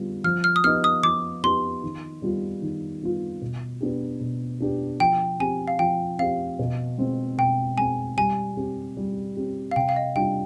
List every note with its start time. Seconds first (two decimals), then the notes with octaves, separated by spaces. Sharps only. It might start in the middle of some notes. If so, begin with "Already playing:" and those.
Already playing: D3 G3 B3 F4
0.24 F3 F6
0.44 F6
0.56 D#6
0.64 B3 D#4 G4 F6
0.84 D#6
1.03 F3 D6
1.44 B3 D#4 G4 C6
1.83 D#3
2.22 G3 B3 F4
2.62 D#3
3.02 G3 B3 F4
3.42 B2
3.81 B3 D4 G4
4.20 B2
4.60 B3 D4 G4
5.00 F3 G5
5.40 C4 G4 G#5
5.68 F5
5.79 F3 G5
6.19 C4 G4 F5
6.59 B2
6.98 G#3 C4
7.38 B2 G5
7.78 G#3 C4 G#5
8.17 G3 G#5
8.57 C4 G4
8.97 G3
9.37 C4 G4
9.71 F5
9.76 C3 G5
9.89 F5
9.96 D#5
10.15 G3 D4 F4 G5